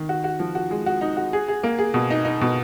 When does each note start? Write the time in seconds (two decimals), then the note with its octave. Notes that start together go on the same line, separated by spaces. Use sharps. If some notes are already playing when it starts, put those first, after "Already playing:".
Already playing: D#3
0.09 F#4
0.24 F#4
0.40 F3
0.55 F#4
0.71 G#3
0.86 F#4
1.01 D#4
1.17 F#4
1.33 G#4
1.48 G#4
1.63 A#3
1.79 G#4
1.94 B2
2.10 D#4
2.25 D#4
2.41 B2